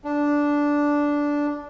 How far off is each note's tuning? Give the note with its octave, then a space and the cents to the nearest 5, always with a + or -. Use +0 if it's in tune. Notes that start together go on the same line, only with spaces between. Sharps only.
D4 -10